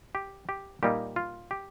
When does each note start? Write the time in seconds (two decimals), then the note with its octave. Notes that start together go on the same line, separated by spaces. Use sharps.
0.15 G4
0.49 G4
0.83 A#2 G3 A#3 D#4 G4
1.16 F4
1.51 G4